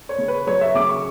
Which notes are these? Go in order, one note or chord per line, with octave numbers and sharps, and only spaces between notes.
C#5
C#3
B4
F#3 C#5
E5
C#3 D6
C#6